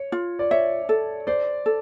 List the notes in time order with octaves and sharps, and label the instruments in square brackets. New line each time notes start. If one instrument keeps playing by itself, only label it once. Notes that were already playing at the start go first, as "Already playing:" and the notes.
Already playing: [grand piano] C#5
[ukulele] F4
[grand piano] D5
[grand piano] C#5 [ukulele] E5
[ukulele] A4
[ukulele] C5 [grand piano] D5
[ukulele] A4